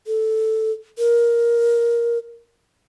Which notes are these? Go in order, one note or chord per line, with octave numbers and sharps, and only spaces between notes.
A4
A#4